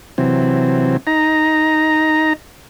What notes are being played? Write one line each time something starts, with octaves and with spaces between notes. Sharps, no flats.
C3 E3 F#3 C4
D#4 A#5